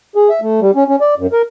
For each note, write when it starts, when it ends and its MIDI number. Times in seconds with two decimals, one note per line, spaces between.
0.15 0.29 68
0.30 0.40 76
0.42 0.60 57
0.61 0.71 55
0.75 0.84 61
0.88 0.96 61
1.01 1.14 74
1.18 1.27 42
1.32 1.42 70